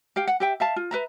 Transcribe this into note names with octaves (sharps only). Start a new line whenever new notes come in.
G4 F5 G5
F#5
G4 E5 G5
E5 F5 A5
F4
B4 E5 A#5